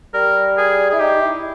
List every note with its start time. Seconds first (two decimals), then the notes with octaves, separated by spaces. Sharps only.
0.14 G3 A#4
0.58 G#4
0.90 E4 G#4
1.00 D#4 G4
1.21 E4